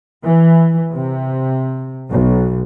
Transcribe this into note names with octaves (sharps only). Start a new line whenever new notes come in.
E3
C3
B1